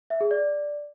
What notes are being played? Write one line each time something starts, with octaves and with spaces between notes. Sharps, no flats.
E5
G#4
D5